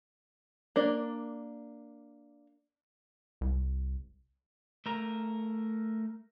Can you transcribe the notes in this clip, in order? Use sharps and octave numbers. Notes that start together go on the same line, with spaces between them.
A#3 D4 D5
C2
A3 A#4